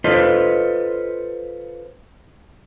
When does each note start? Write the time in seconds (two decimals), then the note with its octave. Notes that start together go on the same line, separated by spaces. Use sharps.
0.04 F4 A4 B4 C5 D#5